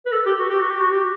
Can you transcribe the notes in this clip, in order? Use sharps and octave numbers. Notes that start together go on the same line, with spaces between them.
B4
A4
G4
F#4
G4
F#4
G4
F#4
G4